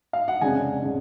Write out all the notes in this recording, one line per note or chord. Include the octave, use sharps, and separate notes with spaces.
F5
F#5
F1 F2 C#3 G#3 D4 G#5
C#3 G#3 D4